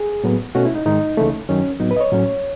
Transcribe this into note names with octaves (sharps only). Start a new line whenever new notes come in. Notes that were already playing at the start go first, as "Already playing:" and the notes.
Already playing: G#4
A2 F#3 B3
B2 A3 C#4 F#4
E4
D#4
G#2 D#3 G#3 D#4
C#2 C#3 E3 A3
F#2 D#3 F#3 C#4
A2 F#3 B3 D#4
B4
D#5
C#5
A2 F#3 C#4